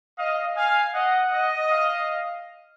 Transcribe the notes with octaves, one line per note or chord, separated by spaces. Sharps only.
D#5 F5
F5 G#5
D#5 F#5
D#5
F5